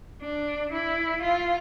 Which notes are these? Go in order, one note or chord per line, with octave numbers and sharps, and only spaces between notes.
D4
E4
F4